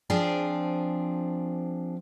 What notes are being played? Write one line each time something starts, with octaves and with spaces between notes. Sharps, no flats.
F3 C4 D4 G#4